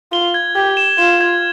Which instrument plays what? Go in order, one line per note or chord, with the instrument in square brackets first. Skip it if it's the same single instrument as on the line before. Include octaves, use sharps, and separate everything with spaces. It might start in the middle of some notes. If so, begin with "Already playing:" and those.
[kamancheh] F4 [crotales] G7
[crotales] G#6
[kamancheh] G4 [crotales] G#6
[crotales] E7
[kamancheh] F4 [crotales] E7
[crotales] G#6